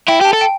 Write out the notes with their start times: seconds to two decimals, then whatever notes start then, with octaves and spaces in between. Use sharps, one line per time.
0.08 E4 G5
0.21 G4 A5
0.33 A4
0.41 G5